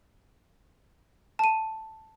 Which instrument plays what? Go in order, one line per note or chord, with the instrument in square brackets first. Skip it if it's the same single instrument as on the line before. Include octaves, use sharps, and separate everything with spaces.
[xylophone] A5 D#7